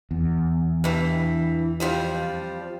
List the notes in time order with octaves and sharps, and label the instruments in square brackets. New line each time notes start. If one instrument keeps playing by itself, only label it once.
[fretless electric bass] E2
[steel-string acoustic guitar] G2 E3
F2 F3 G3